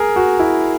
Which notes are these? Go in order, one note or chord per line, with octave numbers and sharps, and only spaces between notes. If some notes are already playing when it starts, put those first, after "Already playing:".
Already playing: G#4 A#4
F#4
E4